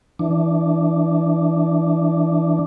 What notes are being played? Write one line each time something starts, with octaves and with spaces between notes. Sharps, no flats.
E3 D4